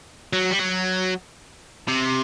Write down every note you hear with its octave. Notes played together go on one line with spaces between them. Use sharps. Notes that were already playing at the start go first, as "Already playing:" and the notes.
F#3
G3
F#3
C3